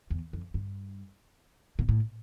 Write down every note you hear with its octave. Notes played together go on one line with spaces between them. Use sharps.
E2
F2
G2
A#2
A2